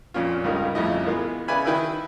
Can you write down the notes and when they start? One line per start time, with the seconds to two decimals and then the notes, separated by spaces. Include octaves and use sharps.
0.14 F2 A#2 C#4 F4
0.44 C#2 G2 C#3 D#4 A#4
0.75 A1 F2 C#3 E4 D#5
1.05 E3 G#3 A#3 B3 F4
1.48 C#3 B4 D5 E5 G#5 B5
1.65 D#3 E4 B4 G5 E6